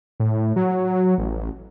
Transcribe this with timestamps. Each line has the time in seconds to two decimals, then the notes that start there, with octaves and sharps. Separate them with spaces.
0.20 A2
0.56 F#3
1.18 A1